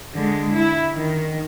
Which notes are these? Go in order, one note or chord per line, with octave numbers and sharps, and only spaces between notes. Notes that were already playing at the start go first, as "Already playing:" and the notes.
D3 G#3
E4
D#3